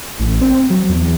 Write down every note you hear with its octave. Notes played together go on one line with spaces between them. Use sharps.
A1
C4
F#3
E2